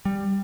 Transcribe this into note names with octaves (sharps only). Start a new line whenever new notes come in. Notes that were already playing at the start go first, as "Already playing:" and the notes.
G3